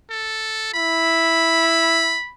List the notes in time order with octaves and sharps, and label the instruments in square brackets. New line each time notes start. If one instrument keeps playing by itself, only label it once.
[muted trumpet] A4
[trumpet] E4 [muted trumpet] B5